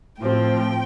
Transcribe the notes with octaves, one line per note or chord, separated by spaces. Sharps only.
A2 F3 C4 G5